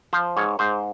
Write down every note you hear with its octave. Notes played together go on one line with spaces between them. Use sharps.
F3 C5
G#2 C#5
G#2 C5